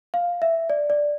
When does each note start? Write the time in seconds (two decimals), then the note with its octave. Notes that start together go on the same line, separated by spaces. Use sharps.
0.14 F5
0.42 E5
0.70 D5
0.90 D5